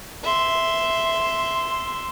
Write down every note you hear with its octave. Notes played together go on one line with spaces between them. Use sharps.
E5 C6